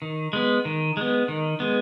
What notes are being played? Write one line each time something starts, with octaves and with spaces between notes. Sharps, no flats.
D#3
G#3 B3
D#3
G#3 B3
D#3
G#3 B3